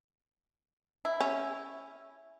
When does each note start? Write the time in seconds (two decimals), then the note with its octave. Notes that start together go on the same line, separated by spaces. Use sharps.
1.05 E4
1.20 C#4